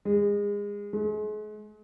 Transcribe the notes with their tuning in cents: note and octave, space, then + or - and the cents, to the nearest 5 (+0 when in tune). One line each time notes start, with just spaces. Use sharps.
G#3 -25
G#3 +40